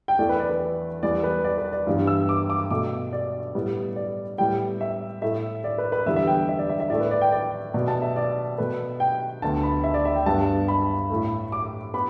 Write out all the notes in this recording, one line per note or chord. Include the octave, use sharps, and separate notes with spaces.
G5
E2 E3 A3 D5
B4
D5
B4
E2 E3 G3 B3 D5
B4
D5
B4
D5
G2 E3 G3 B3
E6
D6
D6
B2 A3 D6
D5
A2 G3 B3
D5
A2 G3 B3 G5
E5
A2 A3 E5
D5
B4
B4
E2 D3 G3 B3 E5
E5
G5
E5
D5
E5
E5
A2 A3 D5
B4
D5
G5
D5
B2 B3 D5
A5
E5
D5
B2 A3 B4
G5
D2 D3 B3 A5
B5
E5
D5
E5
G5
G2 G3 B3 A5
B5
A2 A3
D6
B3 B5